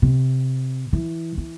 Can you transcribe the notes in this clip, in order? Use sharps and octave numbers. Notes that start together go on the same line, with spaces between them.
C3
E3
E3